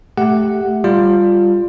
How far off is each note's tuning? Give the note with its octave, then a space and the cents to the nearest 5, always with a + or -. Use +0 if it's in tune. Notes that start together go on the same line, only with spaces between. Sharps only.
A3 -10 G4 +0 F#5 +0
G3 +10 F4 +0